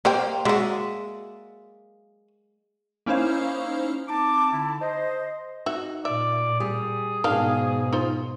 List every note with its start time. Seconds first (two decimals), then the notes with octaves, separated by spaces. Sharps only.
0.05 G3 A#3 C5 G5
0.45 F#3 G#3 F#4 D5 E5
3.06 A#3 C#4 D#4 E4 C5 F5
4.08 C4 D#4 A5 D6
4.51 D3 D#4 E4
4.80 C5 D#5
5.66 D#4 F#4 E5
6.05 A#2 D5 E5
6.60 G3 G#4
7.24 G#2 B2 D#3 G#3 D4 F5
7.93 D#4 F4 C5